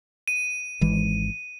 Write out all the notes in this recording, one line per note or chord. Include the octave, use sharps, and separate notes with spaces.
D#7
G#1 E3 G#3